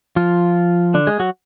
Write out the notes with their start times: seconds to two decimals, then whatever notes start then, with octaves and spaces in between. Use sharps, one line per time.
0.16 F3 F4
0.94 D3 D4
1.07 G#3 G#4
1.20 F#3 F#4